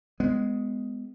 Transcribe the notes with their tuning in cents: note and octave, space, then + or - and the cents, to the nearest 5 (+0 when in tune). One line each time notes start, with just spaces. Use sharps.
G#3 +0 B3 +20